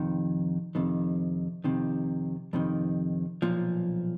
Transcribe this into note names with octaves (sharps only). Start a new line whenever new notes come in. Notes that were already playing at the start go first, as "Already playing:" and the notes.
Already playing: F2 C3 D#3
F2 C3 D#3
F2 C3 D#3
F2 C3 D#3
B1 A#2 F3